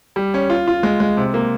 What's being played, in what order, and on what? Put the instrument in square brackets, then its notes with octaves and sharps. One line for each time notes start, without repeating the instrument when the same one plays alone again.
[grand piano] G3
C#4
F4
F4
G#3
G#3
C3
A#3